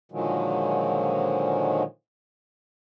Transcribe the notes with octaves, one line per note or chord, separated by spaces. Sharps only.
A#2 D3 D#3 F3 F#3 G#3